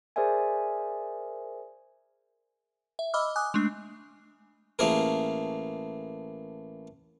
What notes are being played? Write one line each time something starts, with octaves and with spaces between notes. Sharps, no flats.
G#4 A#4 C5 D5 E5 G#5
E5
D#5 B5 D6 E6 F6
G#5 D6 D#6 F#6
G#3 A3 D4
A1 A3 A#3 G#4 A#4